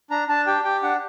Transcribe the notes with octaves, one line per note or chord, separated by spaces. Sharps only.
D4 A#5
D4 A5
G4 G5
G4 G5
D4 F#5